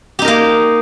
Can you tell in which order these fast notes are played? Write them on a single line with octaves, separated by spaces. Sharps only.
G4 D#4 A#4 A#3